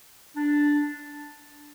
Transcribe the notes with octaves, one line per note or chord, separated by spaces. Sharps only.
D4